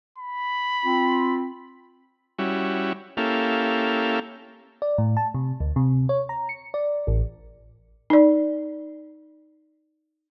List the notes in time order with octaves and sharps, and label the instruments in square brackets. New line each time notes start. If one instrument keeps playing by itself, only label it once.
[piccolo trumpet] B5
[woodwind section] C4 F4
[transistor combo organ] G3 C#4 E4 F#4
A#3 C#4 E4 G4 A4 F5
[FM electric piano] D5
A2
A5
C3
D2
C3
C#5
A#5
C#7
D5
A1
[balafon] D#4 D5